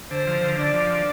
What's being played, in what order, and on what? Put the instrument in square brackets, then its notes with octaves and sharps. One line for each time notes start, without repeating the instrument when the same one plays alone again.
[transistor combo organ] D3 [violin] C5
[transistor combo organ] F3
D3
[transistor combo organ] D4 [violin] D5
[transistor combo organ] F3
D4